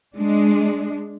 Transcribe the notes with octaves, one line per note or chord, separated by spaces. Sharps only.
G#3 D4